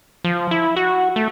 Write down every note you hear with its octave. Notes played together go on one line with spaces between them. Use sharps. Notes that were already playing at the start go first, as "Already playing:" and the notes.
F3
E4
F#4
A3